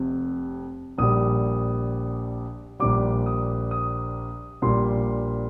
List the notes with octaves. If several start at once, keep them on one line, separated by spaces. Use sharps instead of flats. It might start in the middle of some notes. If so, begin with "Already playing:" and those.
Already playing: F1 F2 C3
A#1 A#2 G3 D#6
A#1 A#2 G3 D6
D#6
D#6
A#1 A#2 G3 C6